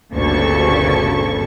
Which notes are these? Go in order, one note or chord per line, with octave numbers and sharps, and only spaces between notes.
G1 D2 A#2 C#3 A4 C#6